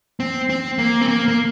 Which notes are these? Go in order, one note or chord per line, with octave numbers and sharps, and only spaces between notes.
C4
C4
A#3
C4
A#3
A#3